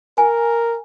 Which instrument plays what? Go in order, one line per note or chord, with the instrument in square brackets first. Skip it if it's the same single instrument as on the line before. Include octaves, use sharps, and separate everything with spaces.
[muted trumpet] A#4 [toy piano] G#5